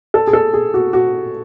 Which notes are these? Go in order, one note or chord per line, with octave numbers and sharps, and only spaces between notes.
A4
G#4
A4
G#4
F#4
F#4